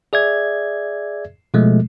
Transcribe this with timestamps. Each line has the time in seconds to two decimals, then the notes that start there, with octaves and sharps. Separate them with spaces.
0.13 G#4 D5 E5 G#6
1.54 B2 F3 G#3 A3